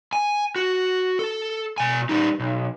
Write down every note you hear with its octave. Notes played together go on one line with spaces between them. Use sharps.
G#5
F#4
A4
B2 G#5
G3 D#4
B1